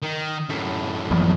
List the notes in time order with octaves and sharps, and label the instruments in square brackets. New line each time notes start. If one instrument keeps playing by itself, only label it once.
[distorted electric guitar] D#3
F#2 A2
[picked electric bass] E3 F3 B3